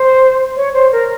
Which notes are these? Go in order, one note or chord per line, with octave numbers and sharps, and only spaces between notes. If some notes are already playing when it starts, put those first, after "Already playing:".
Already playing: C5
C#5
C5
A#4